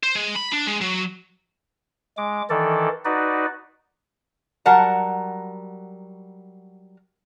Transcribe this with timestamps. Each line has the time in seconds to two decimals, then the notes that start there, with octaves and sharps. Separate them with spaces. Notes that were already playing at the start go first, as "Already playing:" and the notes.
0.03 C5
0.16 G#3
0.36 B5
0.54 D4
0.67 G#3
0.81 F#3
2.17 G#3 D6
2.50 D#3 E3 A4 D5
3.05 D#4 F#4 B4 D5
4.66 F#3 G3 A#4 F#5 A5 A#5